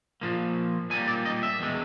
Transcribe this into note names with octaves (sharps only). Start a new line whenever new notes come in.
A#2 F3 A#3
A#2 G3 A#3 G#5
D5
D#5
E5
E2 B2 G#3